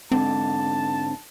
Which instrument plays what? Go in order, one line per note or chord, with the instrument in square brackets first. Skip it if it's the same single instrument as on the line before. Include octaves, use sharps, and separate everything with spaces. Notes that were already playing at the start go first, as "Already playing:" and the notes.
[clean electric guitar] G#2 D3 [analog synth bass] C4 [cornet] A5